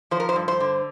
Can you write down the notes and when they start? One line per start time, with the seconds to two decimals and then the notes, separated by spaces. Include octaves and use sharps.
0.11 F3 C5
0.20 A#4
0.29 C5
0.36 G2
0.48 C5
0.60 D3